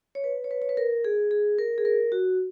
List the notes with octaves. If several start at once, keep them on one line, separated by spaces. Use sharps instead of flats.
C#5
B4
C#5
B4
C#5
B4
A#4
G#4
G#4
A#4
G#4
A#4
F#4